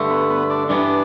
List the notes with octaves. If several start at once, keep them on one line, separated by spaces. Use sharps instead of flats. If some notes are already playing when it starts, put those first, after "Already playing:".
Already playing: G2 D3 A3
B3
B3
D4
G2 E3 B3 D4